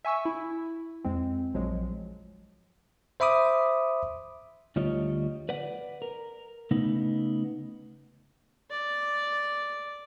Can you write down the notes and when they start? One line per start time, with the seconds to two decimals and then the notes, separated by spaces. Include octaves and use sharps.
0.05 E5 G#5 C#6 E6
0.25 E4
1.04 F2 G#3 C4
1.54 A#1 F3 F#3 G#3
3.20 C5 E5 B5 D6 D#6
4.76 D2 G3 F4 C#5 D#5
5.49 B4 D5 F#5
6.02 A#4
6.71 C#3 A3 B3 D#4
8.70 D5